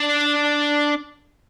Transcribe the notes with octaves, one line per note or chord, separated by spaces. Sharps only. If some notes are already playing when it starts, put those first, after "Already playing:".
Already playing: D4